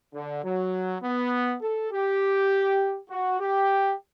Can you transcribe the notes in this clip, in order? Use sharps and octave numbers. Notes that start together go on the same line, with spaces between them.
D3
F#3
B3
A4
G4
F#4
G4